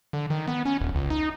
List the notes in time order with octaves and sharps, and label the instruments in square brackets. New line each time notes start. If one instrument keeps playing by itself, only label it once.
[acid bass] D3
D#3
B3
C#4
D#1
C#2
D#4